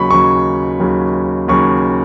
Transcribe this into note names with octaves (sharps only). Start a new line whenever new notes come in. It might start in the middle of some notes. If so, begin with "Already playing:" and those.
Already playing: D#2 C#3 F#3 B5 C#6
D#2 C#3 F#3 C#6
D#2 C#3 F#3
D#2 C#3 F#3 C#6